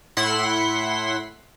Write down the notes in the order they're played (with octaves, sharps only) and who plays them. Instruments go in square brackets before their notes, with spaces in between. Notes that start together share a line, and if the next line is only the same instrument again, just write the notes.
[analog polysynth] A2 E4 F#5 C6 B6